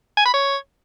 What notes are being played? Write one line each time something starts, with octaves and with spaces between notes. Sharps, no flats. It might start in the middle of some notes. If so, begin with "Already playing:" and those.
G#5
B5
C#5